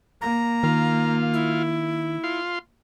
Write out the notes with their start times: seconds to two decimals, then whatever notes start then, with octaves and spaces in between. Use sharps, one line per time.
0.21 A#3 A#5
0.63 D#3 F4
1.34 E4
2.24 F4 C6